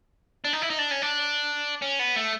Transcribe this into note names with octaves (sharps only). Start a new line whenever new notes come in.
D4
D#4
E4
D#4
D4
C#4
D4
C#4
B3
A3